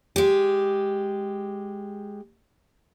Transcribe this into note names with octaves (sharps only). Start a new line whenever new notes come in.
G#3 G4